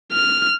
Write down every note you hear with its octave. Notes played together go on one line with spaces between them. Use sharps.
F6